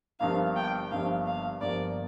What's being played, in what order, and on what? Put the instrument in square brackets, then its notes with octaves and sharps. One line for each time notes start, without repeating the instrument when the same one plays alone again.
[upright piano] G1 G2 F3 A#3 [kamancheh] F5
[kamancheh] G5
[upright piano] G1 G2 F3 A#3 [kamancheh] F5
[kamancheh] F5
[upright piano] G1 G2 F3 A#3 [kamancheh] D5